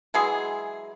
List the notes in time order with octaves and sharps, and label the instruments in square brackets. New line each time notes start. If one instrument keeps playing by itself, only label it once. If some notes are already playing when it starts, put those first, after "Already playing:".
[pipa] E3 F#3 G#3 G#4